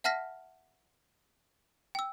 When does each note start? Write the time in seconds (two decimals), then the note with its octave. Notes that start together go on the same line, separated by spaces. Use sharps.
0.04 E5 F#5 A5 F6 A#6 B6
1.95 G5 E6